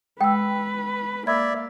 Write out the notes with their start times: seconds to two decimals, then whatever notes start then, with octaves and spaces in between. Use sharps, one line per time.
0.21 G#3 B4 G5 E6
1.27 A#3 D5 E5 B5 G#6